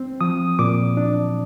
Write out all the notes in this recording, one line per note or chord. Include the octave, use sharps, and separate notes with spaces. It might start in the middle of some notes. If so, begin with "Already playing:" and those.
Already playing: C4
F3 D#6
A#2 D6
D4